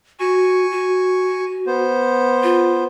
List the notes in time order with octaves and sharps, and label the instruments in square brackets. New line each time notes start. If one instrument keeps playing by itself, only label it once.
[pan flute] F#4 [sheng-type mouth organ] G#5 C#6
[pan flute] F#4
[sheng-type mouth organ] B3 C5
[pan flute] F4